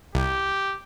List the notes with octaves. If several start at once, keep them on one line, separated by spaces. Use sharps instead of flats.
C2 G4